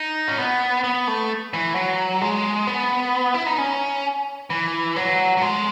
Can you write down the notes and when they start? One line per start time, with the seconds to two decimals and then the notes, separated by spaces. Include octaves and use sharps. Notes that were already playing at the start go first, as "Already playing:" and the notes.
Already playing: D#4
0.28 C#4
0.39 B3
0.84 B3
1.07 A3
1.53 E3
1.75 F#3
2.21 G#3
2.67 B3
3.34 E4
3.46 D#4
3.58 C#4
4.50 E3
4.96 F#3
5.37 F#3
5.41 G#3